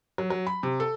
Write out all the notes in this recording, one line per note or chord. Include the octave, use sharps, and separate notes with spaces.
F#3
F#3
B5
C3
A4